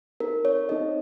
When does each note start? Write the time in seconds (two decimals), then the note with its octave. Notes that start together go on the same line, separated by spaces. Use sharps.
0.20 C4 D#4 A4 A#4
0.45 C#5
0.69 C4 D#4 A4 D#5